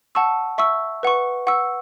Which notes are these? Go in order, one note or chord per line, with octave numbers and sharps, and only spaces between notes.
F#5 A5 C#6 E6
E5 C#6 E6
B4 F#5 C#6
F#5 C#6 E6